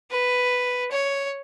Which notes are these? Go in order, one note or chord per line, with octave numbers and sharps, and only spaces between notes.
B4
C#5